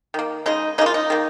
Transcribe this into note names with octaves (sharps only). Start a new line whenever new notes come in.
D#3 A#3
C#3 G#3 D#4
C#3 A#3 D#4 F4
D#4
D#3 A#3